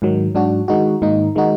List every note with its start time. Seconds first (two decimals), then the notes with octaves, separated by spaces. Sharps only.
0.02 G#2 D#3 F#3
0.35 G#2 F#3 D4 F#4
0.68 D#3 G#3 D#4 F#4
1.02 G#2 D#3 A#3 D#4
1.36 D#3 G#3 D#4 F#4